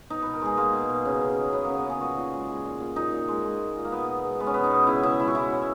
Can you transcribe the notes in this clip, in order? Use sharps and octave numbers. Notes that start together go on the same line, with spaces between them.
B2 D#4
B2 B4
A#4
G#3 G#4
G#3 A#3
B2
B2
C#3
C#3
F#3
F#3 B3
C#3 A#3
B3
C#3 G#4
A#2 F#4
A#2
G#3
G#3
A#2
A#2
A#2 D#4
A#2
G#3
G#3
A#2
A#2
A#3
B2 B3
B2
G#3
G#3 B3
C#4
B2 B3
D#4
B2
C#3 E4
C#3 E4
G#3 E4
F#4
G#3 E4
C#3